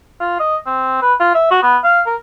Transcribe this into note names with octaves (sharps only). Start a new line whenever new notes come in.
F4
D#5
C4
B4
F4
E5
F#4
B3
F5
A#4